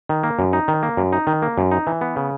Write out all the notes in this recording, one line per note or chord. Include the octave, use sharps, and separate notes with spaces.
D#3
A#3
F#2
D#4
D#3
A#3
F#2
D#4
D#3
A#3
F#2
D#4
E3
B3
C#3